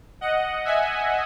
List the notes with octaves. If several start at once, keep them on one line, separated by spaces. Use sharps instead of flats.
D#5 F#5
E5 G#5